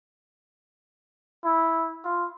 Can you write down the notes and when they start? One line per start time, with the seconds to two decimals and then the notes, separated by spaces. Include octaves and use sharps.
1.44 E4
2.05 F4